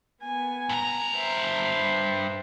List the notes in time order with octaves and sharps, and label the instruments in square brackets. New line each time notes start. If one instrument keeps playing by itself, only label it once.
[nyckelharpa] B3 G#5
[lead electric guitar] G2 A#5
[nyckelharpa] C5 E5